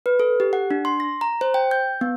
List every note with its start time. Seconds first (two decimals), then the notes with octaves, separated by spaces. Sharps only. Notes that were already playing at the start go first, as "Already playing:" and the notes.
0.06 B4
0.20 A4
0.40 G4
0.53 F#5
0.71 D4
0.85 C6
1.00 A#6
1.21 A#5
1.41 C5
1.54 G5
1.71 G6
2.01 B3